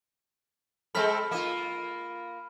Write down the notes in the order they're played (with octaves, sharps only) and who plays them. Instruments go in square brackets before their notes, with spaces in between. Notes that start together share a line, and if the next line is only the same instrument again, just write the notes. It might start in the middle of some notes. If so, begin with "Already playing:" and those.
[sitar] G#3 C4 A4 [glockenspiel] B5 F6 B6
[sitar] A#3 F4